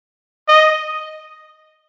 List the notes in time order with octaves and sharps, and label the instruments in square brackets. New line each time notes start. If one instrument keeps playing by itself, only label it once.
[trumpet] D#5